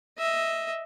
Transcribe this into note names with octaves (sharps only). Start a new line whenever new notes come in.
D#5 E5